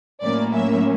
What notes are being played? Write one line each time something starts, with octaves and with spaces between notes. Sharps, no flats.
A2 F#3 A#3 C#4 D5
E5